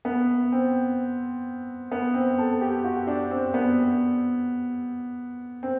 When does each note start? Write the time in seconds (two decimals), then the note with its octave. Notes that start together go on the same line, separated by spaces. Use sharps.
0.05 B3
0.52 C4
1.92 B3
2.14 C4
2.38 A4
2.61 G4
2.84 F#4
3.07 D4
3.31 C4
3.54 B3
5.63 C4